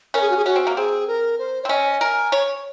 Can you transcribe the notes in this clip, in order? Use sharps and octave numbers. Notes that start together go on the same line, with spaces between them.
C#4 A#4
G#4
F#4
G#4
C#4 F#4
C4
A#3
C4 G#4
A#4
C5
C#5
C4
C#4 D#5
A#4 G#5
C#5